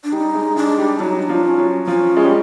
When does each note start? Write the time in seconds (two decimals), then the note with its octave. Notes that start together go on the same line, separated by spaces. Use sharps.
0.04 D4
0.12 G3 D#4
0.34 G#3
0.56 G#3 D4
0.78 G3
0.99 F#3 D#4 F4
1.22 D4
1.29 F3
1.44 D4
1.47 C#4
1.58 F#3
1.87 F3 C#4
2.17 G#3
2.24 G3